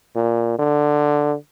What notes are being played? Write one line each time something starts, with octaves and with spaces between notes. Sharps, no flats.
A#2
D3